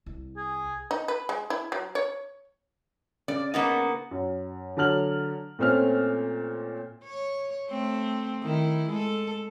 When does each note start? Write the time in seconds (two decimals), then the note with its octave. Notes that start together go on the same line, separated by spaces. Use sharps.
0.06 C2
0.37 G#4
0.91 D#4
1.08 B4
1.29 G#3
1.50 E4
1.72 F#3
1.95 C#5
3.28 C#3 D5
3.54 A#3 B3 D#4
4.11 F#2
4.77 D3 F#3 A5 F6 F#7
5.59 A#2 A3 C4 C#4 F6
7.04 C#5
7.69 A3 C4
8.43 D#3 E4
8.90 G#3 A4